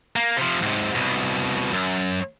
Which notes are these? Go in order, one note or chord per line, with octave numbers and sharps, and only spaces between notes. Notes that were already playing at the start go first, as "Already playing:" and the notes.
A#3
C3 F3
G#2 C3
C2 B2
F#2